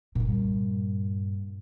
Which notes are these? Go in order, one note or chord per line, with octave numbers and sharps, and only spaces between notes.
G2 A#2